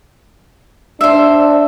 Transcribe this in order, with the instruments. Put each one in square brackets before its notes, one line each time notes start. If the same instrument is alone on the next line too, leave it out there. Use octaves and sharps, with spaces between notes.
[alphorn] D4 [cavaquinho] C5 E5